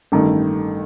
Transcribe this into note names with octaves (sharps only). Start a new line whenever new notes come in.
A1 G2 D#3 A3